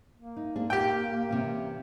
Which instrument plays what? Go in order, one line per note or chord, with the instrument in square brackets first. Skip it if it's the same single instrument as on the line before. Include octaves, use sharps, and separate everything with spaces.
[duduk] A#3
[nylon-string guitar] D#4
[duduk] A#3 [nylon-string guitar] C4 D4 G#4
[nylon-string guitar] A#2 [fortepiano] G4 G5
[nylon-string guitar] C3 E3 C#4